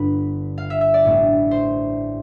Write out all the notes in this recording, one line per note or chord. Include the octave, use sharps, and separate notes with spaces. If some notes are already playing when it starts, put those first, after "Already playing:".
Already playing: G1 G2 D3 D4 B4
F5
E5
E5
D5
A1 A2 G3 B3 D4
C5